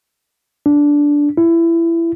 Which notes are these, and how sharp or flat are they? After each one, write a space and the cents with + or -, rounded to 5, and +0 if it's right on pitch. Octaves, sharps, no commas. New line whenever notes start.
D4 -10
E4 +20